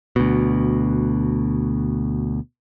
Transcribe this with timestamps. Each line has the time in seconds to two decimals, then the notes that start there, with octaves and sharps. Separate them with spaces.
0.16 D2 B2